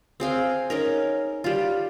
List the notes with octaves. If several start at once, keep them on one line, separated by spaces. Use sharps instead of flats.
C4 G#4 F5 G5
C#4 D#4 A#4
G3 F4